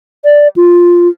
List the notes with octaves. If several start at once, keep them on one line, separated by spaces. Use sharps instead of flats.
D5
F4